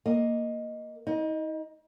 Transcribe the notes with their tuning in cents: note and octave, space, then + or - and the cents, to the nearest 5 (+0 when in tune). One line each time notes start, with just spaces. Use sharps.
A#3 +0 D#5 +0
D#4 +45 D#5 +0